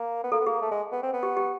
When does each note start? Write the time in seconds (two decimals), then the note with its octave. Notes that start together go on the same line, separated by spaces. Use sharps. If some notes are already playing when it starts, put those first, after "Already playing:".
Already playing: A#3
0.24 B3
0.32 A#3 A4
0.41 B3
0.46 A#3 G#4
0.62 A3
0.71 G#3
0.92 B3
1.03 C4
1.13 B3
1.23 G4
1.37 G4